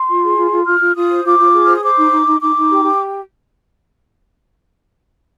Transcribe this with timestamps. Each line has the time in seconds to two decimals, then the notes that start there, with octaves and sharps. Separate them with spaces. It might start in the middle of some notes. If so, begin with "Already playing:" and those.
Already playing: C6
0.09 F4
0.24 G#4
0.38 F4
0.52 F4
0.66 F4 F6
0.81 F4
0.96 F4 D#6
1.11 C5
1.24 F4 D6
1.39 F4
1.54 G#4
1.66 C5 F6
1.75 D#6
1.83 C5 D6
1.98 D#4
2.12 D#4
2.26 D#4
2.41 D#4 D6
2.55 D#4
2.70 G4
2.85 G4